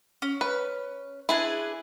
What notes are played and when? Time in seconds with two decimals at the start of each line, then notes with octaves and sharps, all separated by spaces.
0.22 C#4
0.41 B4
1.29 D4 E4 G#4 B4